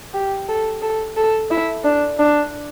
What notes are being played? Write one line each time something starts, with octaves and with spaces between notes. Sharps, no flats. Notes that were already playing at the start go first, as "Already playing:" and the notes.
G4
A4
A4
A4
E4
D4
D4